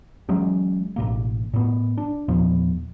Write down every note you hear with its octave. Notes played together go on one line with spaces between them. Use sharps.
E3 F#3 G#3 C#4
A1 B2 A#3
A2 B3
D4
E2 A#2 F3 B3